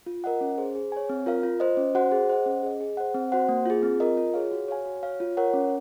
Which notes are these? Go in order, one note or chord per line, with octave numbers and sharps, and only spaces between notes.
F4
A#4 D#5 F#5
C#4
G#4 C5
G#4
C#5 G#5
C4
F4 A#4 F5
F4
C5 D#5
C#4
F#4 C5 F#5
G#4
C5 D#5 F#5
C#4
G#4 D#5
G#4
C5 F#5
C4
F#4 C5 F#5
A#3
F4 G#4
C4
F4 A#4 D#5
F4
G#4 C#5 F5
F#4
C#5 F5 G#5
F#4
C#5 F5
F4
A#4 C#5 F#5
C#4